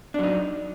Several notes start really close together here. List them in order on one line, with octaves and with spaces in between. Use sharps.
D4 F#3 D#4